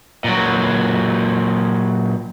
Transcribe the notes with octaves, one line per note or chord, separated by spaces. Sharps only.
A#2 F#3